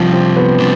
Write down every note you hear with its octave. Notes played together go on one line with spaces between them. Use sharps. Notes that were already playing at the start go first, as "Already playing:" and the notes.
Already playing: C3 F3 G3 D4
C4
B3
C3 G3 D4